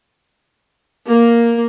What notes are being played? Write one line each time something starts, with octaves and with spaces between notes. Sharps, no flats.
A#3